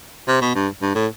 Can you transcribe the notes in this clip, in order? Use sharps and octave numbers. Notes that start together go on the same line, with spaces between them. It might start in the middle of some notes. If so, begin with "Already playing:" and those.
C3
B2
G2
G2
A2